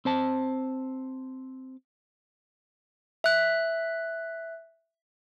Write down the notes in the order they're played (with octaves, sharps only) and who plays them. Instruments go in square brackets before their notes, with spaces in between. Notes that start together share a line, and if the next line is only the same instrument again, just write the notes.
[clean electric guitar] C4 C5 A5
[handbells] E5 F#6